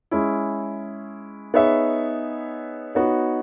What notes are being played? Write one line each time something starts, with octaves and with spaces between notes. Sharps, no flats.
G#3 C#4 E4
B3 D#4 G#4 C#5 E5
B3 D#4 F#4 C#5